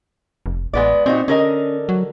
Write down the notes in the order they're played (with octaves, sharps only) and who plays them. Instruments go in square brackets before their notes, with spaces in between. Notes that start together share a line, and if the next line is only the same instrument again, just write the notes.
[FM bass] F1
[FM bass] A1 [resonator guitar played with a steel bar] G#3 B3 D5
[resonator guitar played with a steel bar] A#2 D#4 F#4 [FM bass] C4
[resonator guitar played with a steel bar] D3 A#4 D#5 [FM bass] C#4
[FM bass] F#3